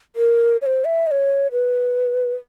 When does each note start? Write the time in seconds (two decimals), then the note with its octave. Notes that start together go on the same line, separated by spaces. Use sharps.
0.16 A#4
0.62 C#5
0.66 C5
0.85 E5
1.07 D#5
1.11 C#5
1.52 B4